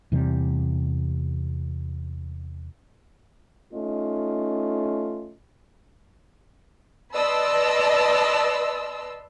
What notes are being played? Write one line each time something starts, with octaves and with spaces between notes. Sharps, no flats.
E2 C3 G3
A3 C#4 D#4 F4 D#5
B4 D5 D#5 A5 C6 E6